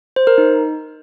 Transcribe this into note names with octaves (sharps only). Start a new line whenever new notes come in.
C5
A#4
D#4